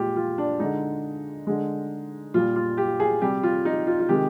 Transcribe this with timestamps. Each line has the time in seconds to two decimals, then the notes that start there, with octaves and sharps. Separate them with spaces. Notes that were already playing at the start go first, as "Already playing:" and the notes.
Already playing: A#2 G#3 F4 G4
0.16 F4
0.38 D4
0.60 D3 G#3 D#4
1.47 D3 G#3
2.34 A#2 G3 F4
2.56 F4
2.77 G4
3.00 G#4
3.22 C3 G3 G4
3.43 F4
3.65 D#4
3.87 F4
3.99 F4
4.09 C3 D#3 G#3 G4